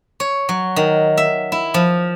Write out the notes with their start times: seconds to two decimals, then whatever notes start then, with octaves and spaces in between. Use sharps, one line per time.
0.20 C#5
0.49 F#3
0.76 D#3
1.17 E5
1.52 E4
1.74 F3